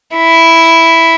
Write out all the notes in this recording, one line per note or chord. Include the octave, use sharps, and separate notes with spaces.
E4